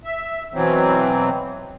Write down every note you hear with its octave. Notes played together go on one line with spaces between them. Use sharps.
E5
B2 E3 F#3 C4